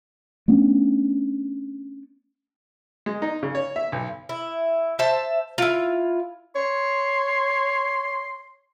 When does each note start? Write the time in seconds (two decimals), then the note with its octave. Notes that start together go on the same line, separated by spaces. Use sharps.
0.48 A3 B3 C#4 D4
3.06 G#3
3.22 D#4
3.43 C#3
3.55 C#5
3.76 E5
3.92 B1
4.29 E4
4.99 C5 E5 A5
5.58 E4 F4
6.56 C#5 C6